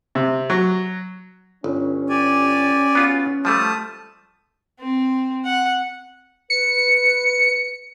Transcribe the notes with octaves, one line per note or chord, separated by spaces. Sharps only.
C3
F#3
G1 C#4
G4 D5 G#5
B3 F4 F#4
F3 G3 A3 A5 D#6
C4
F#5
B4 C#7